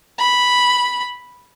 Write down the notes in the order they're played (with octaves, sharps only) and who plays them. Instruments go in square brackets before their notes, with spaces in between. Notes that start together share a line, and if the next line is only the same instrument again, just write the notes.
[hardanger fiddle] B5